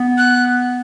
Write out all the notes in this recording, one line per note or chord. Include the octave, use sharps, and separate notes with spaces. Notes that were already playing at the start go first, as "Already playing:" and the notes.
Already playing: B3
F#6